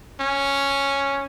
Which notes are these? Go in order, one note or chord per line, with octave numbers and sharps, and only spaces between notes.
C#4